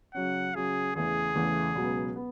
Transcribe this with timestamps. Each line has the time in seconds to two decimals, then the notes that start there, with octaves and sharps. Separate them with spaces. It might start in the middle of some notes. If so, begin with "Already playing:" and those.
0.14 C#3 F#3 C#4 F#5
0.55 C#3 F#3 C#4 G#4
0.95 E2 C#3 E3 A3 G#4
1.35 E2 C#3 E3 A3
1.76 C#2 B2 F#3 B3
2.16 B3